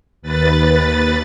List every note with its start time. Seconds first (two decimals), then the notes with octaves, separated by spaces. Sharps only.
0.22 D#2 B4 A6